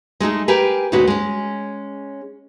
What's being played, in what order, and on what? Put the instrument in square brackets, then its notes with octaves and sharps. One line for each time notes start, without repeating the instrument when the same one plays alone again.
[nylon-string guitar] G#3 A3 D#4 G#4
G4 G#4 A#4 B4 G#5
D2 A#2 G#3 C#4 F#4 B4
G#3 C#4